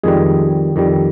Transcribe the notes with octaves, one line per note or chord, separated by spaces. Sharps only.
F2 D#3 G3 G#3 G#4
F2 D#3 G3